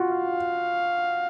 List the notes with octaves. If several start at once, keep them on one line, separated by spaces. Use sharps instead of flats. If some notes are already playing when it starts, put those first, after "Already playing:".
Already playing: F4 F#4
F5